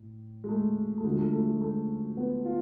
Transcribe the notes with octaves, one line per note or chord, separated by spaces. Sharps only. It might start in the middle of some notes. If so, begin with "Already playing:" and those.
Already playing: A2
G#3
A3
A3
D2 D3 F3 G#3
A3
A3
G#3
A3
B3
F4